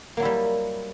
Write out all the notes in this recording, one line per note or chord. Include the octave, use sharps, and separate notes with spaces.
F#3 G3 A#3 E4